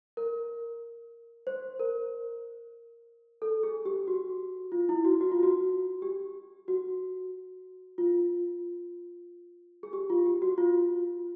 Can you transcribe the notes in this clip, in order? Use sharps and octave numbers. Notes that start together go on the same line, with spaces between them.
A#4
C5
A#4
A4
G#4
G4
F#4
F4
E4
F#4
F#4
F4
F#4
G4
F#4
F4
G#4
G4
F4
G4
F#4
F4